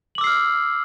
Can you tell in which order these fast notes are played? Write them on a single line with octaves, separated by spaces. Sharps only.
F#7 D6 E6 C7 F6